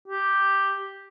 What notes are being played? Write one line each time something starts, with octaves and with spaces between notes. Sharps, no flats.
G4